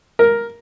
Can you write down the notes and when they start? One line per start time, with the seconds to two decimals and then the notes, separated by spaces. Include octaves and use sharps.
0.19 A#4